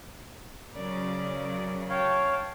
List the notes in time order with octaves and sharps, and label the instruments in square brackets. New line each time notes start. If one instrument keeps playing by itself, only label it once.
[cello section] C#3 F#3 [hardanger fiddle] A#4 D5
[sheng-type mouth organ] C#5 F5 [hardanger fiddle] G5 A5